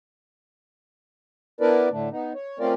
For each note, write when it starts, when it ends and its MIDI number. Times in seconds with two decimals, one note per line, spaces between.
1.61 1.89 59
1.61 1.89 62
1.61 1.89 64
1.61 1.89 70
1.61 1.89 71
1.61 1.89 74
1.91 2.09 45
1.91 2.09 50
1.91 2.09 57
1.91 2.09 62
2.11 2.33 59
2.11 2.33 63
2.35 2.59 73
2.59 2.74 57
2.59 2.74 60
2.59 2.74 61
2.59 2.74 65
2.59 2.74 70
2.59 2.74 74